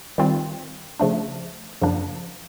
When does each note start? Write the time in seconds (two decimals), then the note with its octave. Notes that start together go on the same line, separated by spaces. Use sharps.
0.18 D#3 G3 C4 F4
1.00 C#3 F3 A3 D4
1.82 F#2 C#3 F3 A#3 D4